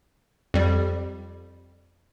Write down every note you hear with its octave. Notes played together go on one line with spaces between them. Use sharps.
F2 G3